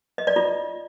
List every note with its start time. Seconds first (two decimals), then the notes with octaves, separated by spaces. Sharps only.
0.18 D#5
0.27 D5
0.36 F4